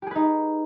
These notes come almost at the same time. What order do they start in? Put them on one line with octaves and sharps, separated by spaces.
G4 G#4 B4 D#4